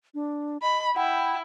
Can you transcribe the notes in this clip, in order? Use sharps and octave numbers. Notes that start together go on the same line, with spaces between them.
D4
D#5 B5
E4 F#5 G5 B5